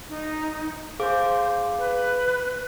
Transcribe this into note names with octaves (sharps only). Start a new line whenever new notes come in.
D#4
G#4 C5 F5 D6
B4